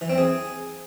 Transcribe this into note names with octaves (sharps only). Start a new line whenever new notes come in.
E3
C4
G#4